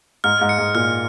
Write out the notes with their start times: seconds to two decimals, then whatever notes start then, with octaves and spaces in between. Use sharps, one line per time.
0.24 G#2 F6
0.41 G#2
0.49 C#7
0.58 G#2
0.75 A#2 F6